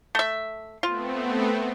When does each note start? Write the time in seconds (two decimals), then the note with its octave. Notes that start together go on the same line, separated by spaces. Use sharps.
0.15 A3 E5
0.83 A3 B3 C4 F4